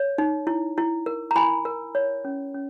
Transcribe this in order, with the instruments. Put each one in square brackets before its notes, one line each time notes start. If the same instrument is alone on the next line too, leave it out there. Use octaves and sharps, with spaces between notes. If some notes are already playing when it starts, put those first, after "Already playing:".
Already playing: [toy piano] C#5
D#4
E4
E4
A#4
A#5
E4 G#5 B5
A#4
C#5
C#4
C#4